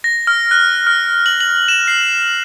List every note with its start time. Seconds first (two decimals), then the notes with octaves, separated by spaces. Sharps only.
0.04 A#6
0.27 F6
0.51 F#6
0.87 F6
1.26 F#7
1.40 F#7
1.68 E7
1.88 C7